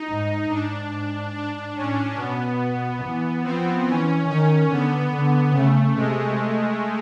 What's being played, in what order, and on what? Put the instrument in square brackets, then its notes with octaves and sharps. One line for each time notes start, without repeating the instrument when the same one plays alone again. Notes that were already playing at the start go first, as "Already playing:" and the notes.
Already playing: [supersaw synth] D#4
[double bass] G#2
[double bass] G#2 [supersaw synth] D4
[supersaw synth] D4
[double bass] A2 [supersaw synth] C#4
[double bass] B2 [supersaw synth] B3
[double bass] E3
[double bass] F3 [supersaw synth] C4
[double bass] E3 [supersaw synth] C#4
[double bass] D#3 [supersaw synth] C#4
[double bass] D3 [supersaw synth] B3
[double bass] D3
[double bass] C#3 [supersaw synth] A3
[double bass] C3 [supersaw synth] G#3